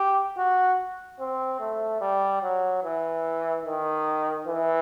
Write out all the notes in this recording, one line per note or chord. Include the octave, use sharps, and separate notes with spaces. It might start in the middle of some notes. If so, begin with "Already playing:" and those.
Already playing: G4
F#4
C4
A3
G3
F#3
E3
D#3
E3